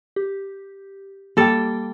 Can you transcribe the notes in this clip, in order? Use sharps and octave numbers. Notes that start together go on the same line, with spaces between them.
G4
G3 A#3 A4 G5